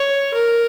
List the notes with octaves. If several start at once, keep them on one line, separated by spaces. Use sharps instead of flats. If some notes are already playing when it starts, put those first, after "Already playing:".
Already playing: C#5
A#4